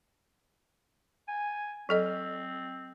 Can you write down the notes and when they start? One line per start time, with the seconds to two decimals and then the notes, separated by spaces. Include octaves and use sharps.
1.28 G#5
1.89 F#3 C4 A4 D#5